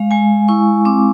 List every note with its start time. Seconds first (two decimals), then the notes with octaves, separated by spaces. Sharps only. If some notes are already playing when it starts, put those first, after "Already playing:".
Already playing: G#3 F5
0.11 G#3 G#5
0.48 E4 C#6
0.85 C4 D6